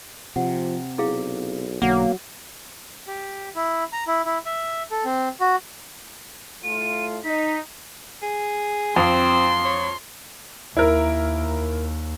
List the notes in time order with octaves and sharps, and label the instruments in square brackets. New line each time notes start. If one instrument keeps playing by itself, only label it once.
[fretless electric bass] C3 [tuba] F3 [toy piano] F#5
[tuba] B1 [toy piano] E4 G#4 F5
[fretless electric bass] B1 D3 [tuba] F#3 [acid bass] A#3 [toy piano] F#5
[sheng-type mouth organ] G4
E4
A#5
E4
E4
E5
A4
C4
F#4
[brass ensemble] A2 A3 F4 [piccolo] D#7
[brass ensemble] D#4 [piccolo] B6
[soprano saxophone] G#4
[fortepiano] F2 [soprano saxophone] C4 [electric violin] C6
[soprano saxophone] C#5
[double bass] D#2 [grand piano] E4 A#4